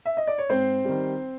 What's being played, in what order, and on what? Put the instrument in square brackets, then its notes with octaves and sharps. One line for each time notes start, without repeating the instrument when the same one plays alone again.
[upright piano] E5
D#5
D5
C#5
G#2 C4 C5
D#3 G3